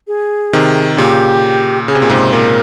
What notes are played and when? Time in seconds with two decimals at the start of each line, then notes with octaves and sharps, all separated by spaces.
0.08 G#4
0.53 C3 D#3
0.97 A#2 C#3 G4
1.88 C#3 G#4
1.95 C3
2.02 A#2
2.09 G#2 C3 C5
2.33 A#2 A#4